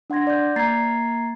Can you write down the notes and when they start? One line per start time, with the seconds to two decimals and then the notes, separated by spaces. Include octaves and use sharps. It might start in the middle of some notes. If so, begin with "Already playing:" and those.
0.10 D4 F#5 C6 G#6 A#6
0.27 D5 G6
0.56 A#3 A#5 G#6 A6 C7